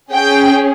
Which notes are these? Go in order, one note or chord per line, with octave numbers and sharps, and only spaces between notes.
C#4 G#4 G5